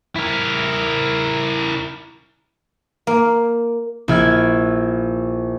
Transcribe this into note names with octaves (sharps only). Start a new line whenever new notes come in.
E4 A#4
A#3
A#1 E4 F6 G#6